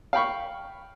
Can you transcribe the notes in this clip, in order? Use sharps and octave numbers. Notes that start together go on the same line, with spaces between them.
F5 G5 B5 C#6